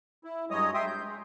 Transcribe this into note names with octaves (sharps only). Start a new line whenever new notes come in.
E4
G2 F#3 G#3 C#5 D#5 D#6
E5 G5 C6 D#6
G6
G#3